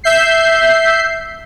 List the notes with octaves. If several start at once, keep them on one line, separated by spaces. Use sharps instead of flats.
E5 G6 C7